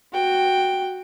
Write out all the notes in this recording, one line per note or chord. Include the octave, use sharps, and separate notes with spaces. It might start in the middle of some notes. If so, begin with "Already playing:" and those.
F#4 G5